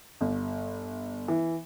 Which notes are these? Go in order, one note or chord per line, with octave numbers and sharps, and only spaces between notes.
G1
E3